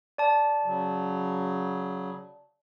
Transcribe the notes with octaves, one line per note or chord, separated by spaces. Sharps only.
D5 A5
C#3 F#3